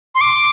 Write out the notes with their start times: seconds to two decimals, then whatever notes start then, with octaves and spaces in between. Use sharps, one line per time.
0.15 C6
0.21 D6